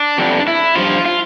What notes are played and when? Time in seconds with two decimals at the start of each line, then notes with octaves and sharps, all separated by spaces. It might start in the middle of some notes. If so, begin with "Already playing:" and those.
Already playing: D4
0.18 F2 D3 G3
0.48 E4
0.76 G2 F3 F4
1.06 F4